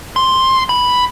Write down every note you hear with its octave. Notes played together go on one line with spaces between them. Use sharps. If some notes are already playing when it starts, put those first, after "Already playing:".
C6
B5